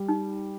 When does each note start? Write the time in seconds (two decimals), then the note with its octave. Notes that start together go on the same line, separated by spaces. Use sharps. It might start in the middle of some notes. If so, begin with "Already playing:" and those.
Already playing: G3
0.09 D#4